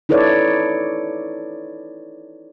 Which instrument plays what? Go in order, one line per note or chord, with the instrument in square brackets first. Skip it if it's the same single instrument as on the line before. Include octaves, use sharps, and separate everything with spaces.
[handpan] D#4 E4 A4 B4 C#5 D5